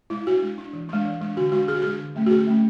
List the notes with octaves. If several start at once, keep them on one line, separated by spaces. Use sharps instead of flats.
G#3 E4
D4 F#4
G#3
D4
E3
G#3 D4
E3
G#3 D4
D3 F#4
G#3 D4 F#4
D3 G#4
F#4
G#3 D4 G#4
D3
F#3 A3 C#4
F#4
D3 G#4
F#3 A3 C#4